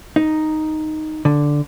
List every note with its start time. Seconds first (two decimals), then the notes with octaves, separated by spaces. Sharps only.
0.16 D#4
1.25 D3